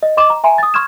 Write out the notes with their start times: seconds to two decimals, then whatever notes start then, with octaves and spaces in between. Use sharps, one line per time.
0.03 D#5
0.17 D#5 C6 D6 E7
0.30 A#5
0.44 E5 G#5 A#5 C6
0.58 D#6 A6
0.74 C6 C#6 F6 G#6 E7